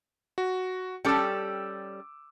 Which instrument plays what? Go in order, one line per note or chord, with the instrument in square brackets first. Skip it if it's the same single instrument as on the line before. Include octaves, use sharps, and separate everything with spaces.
[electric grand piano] F#4
[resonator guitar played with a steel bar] G3 C#4 A4 [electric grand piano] G5 D6 E6